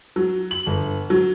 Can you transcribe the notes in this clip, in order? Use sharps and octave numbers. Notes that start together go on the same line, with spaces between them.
F#3
F#7
G1
F#3